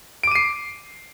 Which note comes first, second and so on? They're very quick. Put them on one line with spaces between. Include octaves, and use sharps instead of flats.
D7 D6 D#7 C7